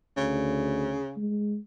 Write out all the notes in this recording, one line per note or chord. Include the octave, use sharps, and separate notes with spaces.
D2 C#3
G#3